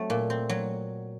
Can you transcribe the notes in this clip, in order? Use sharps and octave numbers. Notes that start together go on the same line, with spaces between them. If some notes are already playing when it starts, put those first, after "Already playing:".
Already playing: F#3 A3 C4
A#2
C4
F#3